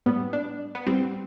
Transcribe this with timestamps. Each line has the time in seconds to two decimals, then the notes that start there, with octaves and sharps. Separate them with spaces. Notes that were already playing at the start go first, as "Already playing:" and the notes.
0.06 A2 G3 B3
0.33 D4
0.75 B3
0.87 A2 G3 C4